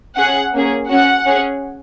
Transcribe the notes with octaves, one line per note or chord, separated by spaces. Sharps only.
C#4 G#4 F#5
A#3 C#4 G#4
C#4 F#4 F#5
C#4 G#4